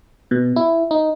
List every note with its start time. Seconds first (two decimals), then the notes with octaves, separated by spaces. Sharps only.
0.31 B2
0.56 E4
0.91 D#4